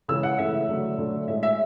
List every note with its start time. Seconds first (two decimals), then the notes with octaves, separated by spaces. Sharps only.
0.08 C#3 E3 G#3 E6
0.23 F#5
0.38 C#3 E3 A3 E5
0.68 D3 F#3 A3
0.98 D3 F#3 A3
1.27 A2 G#3 E5
1.43 E5